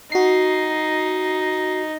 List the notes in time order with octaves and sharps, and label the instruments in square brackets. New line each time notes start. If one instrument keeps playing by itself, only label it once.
[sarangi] D#4 [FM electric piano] F#4 C7